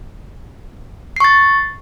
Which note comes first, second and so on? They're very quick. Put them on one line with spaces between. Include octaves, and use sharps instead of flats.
C7 C#6 A6